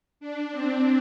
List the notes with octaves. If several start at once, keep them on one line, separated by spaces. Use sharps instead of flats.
D4
C4